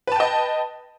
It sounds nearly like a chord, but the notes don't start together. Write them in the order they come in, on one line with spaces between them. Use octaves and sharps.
B4 A5 G5 D#5